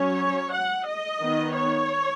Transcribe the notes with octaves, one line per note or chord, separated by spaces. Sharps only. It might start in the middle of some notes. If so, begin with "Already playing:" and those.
Already playing: F#3 C#4 C#5
F#5
D#5
D#3 B3
C#5